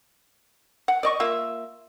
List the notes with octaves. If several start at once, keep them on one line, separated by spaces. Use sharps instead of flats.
F#5
D5 D#5 C#6
A#3 F4 E5